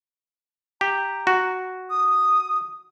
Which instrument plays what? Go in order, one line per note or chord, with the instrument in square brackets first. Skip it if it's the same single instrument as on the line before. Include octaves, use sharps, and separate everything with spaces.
[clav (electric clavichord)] G4 [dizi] A#5
[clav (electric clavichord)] F#4
[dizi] D#6